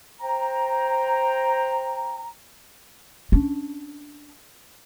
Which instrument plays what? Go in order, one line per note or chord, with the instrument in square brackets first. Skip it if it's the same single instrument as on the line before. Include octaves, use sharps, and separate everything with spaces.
[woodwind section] C5 G5 A#5
[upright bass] C#4 D4